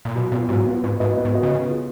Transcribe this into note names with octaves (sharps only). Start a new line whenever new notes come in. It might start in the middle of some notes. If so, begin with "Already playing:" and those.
A#2
B2 F#3
A#2 B3 F4
G#2 F#3
B3 F4
G#2 B3
G#2 F#4 B4 D#5
B3
G#2
F#4 B4 D#5
C#3
B3
F4 G#4